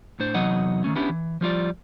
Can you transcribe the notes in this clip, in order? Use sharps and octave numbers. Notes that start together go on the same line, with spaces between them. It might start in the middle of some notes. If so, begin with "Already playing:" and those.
A2 D4 C5
E2 C3 F#3 D#4 D#5 F#5
D#3 E3 A3 C#4
B3 C#4 D4 E4 G4
E3
F3 G3 F4 D5